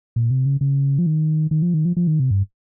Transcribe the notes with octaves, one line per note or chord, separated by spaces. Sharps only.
A#2
C3
C#3
C#3
F3
D#3
D#3
F3
D#3
F3
F3
D#3
C3
G2